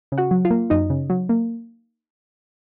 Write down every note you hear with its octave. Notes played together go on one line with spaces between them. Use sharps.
C#3
F#4 F#5
F#3
F4 F5
A#3
F#2 D#4 D#5
C#3
F#3
A#3